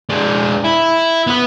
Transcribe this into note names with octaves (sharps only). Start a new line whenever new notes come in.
G#3 D4
E4
B3 B4